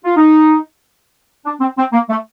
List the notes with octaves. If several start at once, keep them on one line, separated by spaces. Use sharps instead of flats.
F4
D#4
D4
C4
C4
A#3
A3